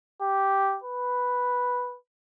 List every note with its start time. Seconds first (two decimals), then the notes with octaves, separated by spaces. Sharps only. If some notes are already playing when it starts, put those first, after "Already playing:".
0.22 G4
0.84 B4